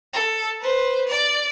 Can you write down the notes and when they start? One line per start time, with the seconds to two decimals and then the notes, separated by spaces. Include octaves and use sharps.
0.13 A4
0.61 B4 C5
1.09 D5